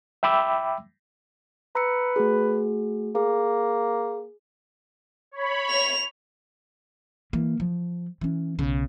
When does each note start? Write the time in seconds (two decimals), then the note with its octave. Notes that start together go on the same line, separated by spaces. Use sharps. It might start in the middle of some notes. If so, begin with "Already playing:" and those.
0.23 E5 G5 B5 D6 E6
1.75 B4 A#5 E6 C#7
2.16 A3 F#4 G#4
3.15 A#3 G#4
5.31 C#5 B5
5.70 F7
7.33 E3 A#3
7.60 F3
8.21 E3 C#4
8.59 B1 C#3